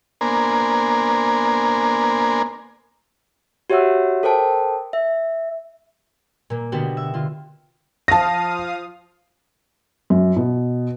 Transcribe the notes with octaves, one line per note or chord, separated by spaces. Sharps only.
A#3 B3 D4 A#4 C5 G#5
F#4 G4 C#5 E5 F#5 E6
A4 A#4 C5 G5 A5
E5
A#2 A#3
B2 D3 B3 F#4 G4
E5
D3 F4
F3 F5 A5 D#6 A#6
F#2
B2